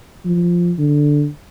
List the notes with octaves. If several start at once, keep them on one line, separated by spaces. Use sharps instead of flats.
F3
D3